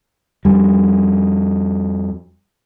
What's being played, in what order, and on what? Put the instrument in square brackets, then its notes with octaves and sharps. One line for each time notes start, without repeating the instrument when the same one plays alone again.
[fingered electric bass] F2 G3